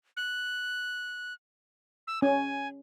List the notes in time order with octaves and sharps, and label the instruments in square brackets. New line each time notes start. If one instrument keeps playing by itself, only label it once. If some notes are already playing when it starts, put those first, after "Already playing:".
[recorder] F#6
E6
[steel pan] C#4 [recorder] G#5